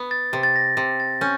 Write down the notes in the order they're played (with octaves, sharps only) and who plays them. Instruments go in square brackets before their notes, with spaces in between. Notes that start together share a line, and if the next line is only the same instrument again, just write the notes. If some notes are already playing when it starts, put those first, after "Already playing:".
Already playing: [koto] B3
[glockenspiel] A6
[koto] C3
[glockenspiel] A6
A#6
[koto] C3
[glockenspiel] A6
[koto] C#4 [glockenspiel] G6